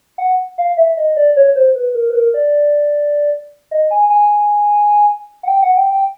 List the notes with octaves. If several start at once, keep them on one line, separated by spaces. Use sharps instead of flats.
F#5
F5
E5
D#5
D5
C#5
C5
B4
A#4
B4
A#4
D5
D#5
G#5
G#5
F#5
G5
F#5
G5
G5